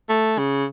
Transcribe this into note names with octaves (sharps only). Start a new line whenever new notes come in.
A3
C#3